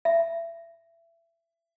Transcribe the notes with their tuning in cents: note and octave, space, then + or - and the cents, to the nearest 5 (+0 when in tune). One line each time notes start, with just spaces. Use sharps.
E5 +25